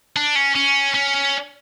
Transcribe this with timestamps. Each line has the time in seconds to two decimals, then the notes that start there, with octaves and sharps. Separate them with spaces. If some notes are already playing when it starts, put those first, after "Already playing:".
0.16 D4
0.36 C#4
0.55 C#4
0.94 C#4